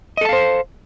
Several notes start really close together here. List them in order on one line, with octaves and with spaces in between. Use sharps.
D#5 A4 A5 F5 C5